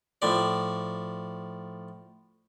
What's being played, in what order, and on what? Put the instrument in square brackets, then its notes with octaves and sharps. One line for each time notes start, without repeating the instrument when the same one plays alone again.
[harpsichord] A2 F3 D5